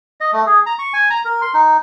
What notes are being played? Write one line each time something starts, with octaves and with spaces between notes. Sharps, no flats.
D#5
A3
G#4
A#5
C#6
G#5
A#5
A#4
C6
D#4